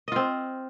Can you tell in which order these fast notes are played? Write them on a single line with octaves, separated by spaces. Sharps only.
D#5 F4 C4